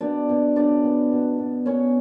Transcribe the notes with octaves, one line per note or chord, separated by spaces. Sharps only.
B2 D4 D5
B2
C#3 D4 D5
B3
B2
B2
B2 C#4 C#5